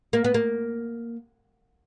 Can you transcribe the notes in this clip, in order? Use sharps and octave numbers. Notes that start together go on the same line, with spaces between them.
A#3
B3
A#3